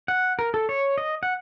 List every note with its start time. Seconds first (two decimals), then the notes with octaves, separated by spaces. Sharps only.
0.08 F#5
0.39 A#4
0.54 A4
0.69 C#5
0.98 D#5
1.23 F#5